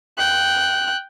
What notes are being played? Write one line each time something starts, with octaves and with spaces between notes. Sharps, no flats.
G5 F#6